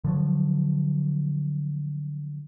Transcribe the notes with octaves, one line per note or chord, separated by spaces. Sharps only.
D3 F3 F#3